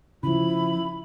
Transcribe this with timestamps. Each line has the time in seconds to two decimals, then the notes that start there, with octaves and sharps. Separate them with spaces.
0.23 C#3 F3 E4 B5